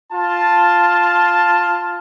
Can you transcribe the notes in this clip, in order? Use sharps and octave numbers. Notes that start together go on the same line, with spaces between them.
F4 A5